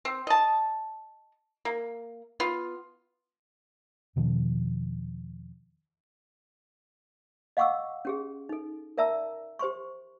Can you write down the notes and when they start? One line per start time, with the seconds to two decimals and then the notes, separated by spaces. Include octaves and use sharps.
0.05 C4
0.27 D#5 A5
1.65 A#3
2.40 B3 F4
4.16 E2 B2 D#3 F3
7.57 D#5 F5 F#5 C#6 D6 E6
8.05 C#4 G4 G#4
8.49 D#4 A4
8.98 A#4 D5 E5 A5 A#5 E6
9.59 G4 C5 C6 C#6